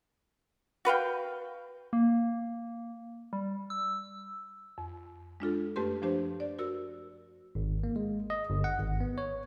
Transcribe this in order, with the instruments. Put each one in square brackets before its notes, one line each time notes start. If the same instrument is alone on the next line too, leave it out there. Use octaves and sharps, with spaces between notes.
[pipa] F#4 B4 F5 G5
[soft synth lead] A#3
G3
E6
[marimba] F2
G#3 D4 F4 A4
F#2 A3 C#4 G4 B4 C6
F3 A3 D4 G4 C5
D5
F#4 A#4 E6
[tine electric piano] G#1
A#3
G#3
D#5
G1
F#5
G#1
B3
C#5